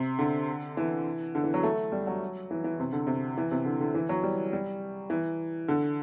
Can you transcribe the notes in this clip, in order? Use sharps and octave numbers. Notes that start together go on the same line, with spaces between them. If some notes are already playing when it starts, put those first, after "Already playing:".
Already playing: C3
D3
E3
D3
E3
F#3
A3
G3
F#3
E3
E3
C3
D3
C3
E3
C3
D3
D3
E3
F#3
G3
G3
E3
D3